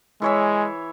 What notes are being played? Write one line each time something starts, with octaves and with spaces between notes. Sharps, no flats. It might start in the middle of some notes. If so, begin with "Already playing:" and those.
E3 G#3 C#5 E5